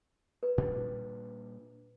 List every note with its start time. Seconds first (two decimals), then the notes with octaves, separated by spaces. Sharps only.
0.43 B4
0.58 A#2 G3 D4